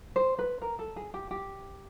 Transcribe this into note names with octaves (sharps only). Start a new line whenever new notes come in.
C5
B4
A#4
A4
G#4
G4
G4